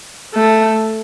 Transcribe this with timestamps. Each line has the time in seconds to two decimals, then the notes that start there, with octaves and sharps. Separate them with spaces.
0.34 A3